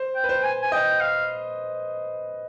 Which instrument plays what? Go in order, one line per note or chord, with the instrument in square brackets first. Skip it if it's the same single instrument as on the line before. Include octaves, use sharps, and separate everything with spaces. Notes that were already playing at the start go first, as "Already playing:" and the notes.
Already playing: [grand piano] C5
[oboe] G5
[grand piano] B4
C5
[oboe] G#5
G#5
[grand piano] D#5 [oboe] G5
[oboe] F5